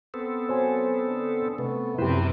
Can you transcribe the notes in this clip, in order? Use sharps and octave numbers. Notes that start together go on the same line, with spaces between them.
B3 C4 A4
F#3 C5 G#5
D3
C3 A3 B3
F#2 C3 C4 E4 G4 B4 C5